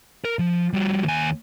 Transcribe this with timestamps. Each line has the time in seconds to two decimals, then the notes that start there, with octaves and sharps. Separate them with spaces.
0.25 A#4
0.39 F3
0.73 G3 F#4
1.04 D#2 G#5